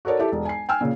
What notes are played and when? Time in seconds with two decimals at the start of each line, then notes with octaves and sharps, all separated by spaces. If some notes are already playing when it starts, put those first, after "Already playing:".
0.05 F#4 A4 A#4 C#5 D5
0.19 E4 G4 A4
0.32 E1
0.45 G#5 C7
0.69 G5 G#5 E6 F6
0.81 A#2 C#3